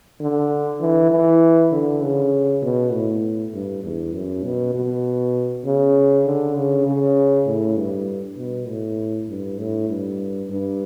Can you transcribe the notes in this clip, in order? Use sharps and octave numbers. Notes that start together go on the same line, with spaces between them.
D3
E3
E3
D3
C#3
B2
A2
G2
E2
F#2
B2
B2
C#3
D3
C#3
C#3
A2
G2
B2
A2
G2
A2
G2
G2